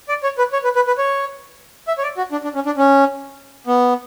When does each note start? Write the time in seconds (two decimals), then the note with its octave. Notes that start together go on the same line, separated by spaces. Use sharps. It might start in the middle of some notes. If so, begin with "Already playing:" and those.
0.09 D5
0.23 C#5
0.38 B4
0.53 C#5
0.64 B4
0.76 B4
0.87 B4
0.98 C#5
1.88 E5
1.98 C#5
2.03 D5
2.17 F#4
2.32 D4
2.44 D4
2.55 C#4
2.66 D4
2.77 C#4
3.67 B3